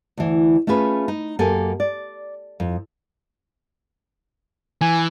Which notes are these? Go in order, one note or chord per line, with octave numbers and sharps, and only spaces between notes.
D2 E3
A3 C#4 F4 G#4 B4
D#4
F#2 A#3 G4 A4 G#5
D5
F2
E3 G#5